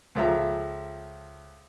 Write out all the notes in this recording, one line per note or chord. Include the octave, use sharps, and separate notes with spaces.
C#2 F3 A4 E5 A#5